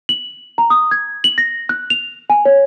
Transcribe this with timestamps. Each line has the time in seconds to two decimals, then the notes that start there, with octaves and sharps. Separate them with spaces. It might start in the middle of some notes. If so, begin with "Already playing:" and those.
0.09 F#7
0.58 A#5
0.70 D#6
0.91 G#6
1.24 F#7
1.38 A#6
1.69 F#6
1.90 F7
2.30 G#5
2.45 C#5